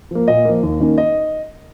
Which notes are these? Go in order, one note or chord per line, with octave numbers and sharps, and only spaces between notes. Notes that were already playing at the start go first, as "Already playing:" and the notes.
F3 A#3
A#2 D#5
F3 A#3
D#2
D#3 A#3 C#4
D#5